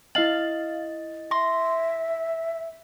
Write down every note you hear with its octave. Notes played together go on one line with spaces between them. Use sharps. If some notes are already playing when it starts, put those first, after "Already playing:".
E4 D#5 F5 A6 F#7
E5 C6 A#6